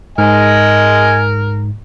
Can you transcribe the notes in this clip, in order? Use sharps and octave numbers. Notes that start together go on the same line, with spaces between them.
G#2 A#4 D#5 G#5